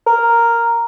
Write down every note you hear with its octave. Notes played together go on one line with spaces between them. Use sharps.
A#4